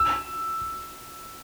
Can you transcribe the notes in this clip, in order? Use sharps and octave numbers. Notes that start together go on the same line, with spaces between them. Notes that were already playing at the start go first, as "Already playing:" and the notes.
Already playing: E6